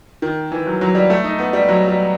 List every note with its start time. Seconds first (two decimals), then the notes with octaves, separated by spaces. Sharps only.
0.22 D#3
0.52 E3
0.67 F#3
0.81 F#3
0.95 G3
1.10 A3
1.24 D#4
1.39 B3
1.53 G3
1.69 F#3
1.88 G3